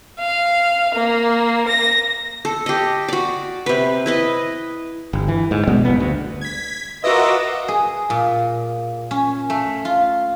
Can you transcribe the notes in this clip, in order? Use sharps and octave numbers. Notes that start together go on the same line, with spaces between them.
F5
A#3
A#6
A4
G4 D#5
F#4 D5
C3 B4
E4 B4 D#5
G1
E3
G#2
B2 G3 G#3 B3
F#1 B3
D2
G#6 B6
F4 F#4 A#4 B4 D#5 E5 D6 E6
G#4
A#2
C#4
A3
F4